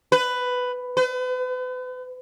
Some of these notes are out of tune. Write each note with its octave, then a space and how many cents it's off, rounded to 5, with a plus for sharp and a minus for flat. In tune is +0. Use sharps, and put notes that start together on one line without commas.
B4 +10
B4 +40